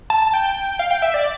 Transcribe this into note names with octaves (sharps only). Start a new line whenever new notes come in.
A5
A5
G5
F5
G5
E5
D5